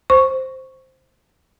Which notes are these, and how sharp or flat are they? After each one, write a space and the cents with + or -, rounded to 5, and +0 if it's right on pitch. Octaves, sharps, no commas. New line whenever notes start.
C5 +0 C#6 +0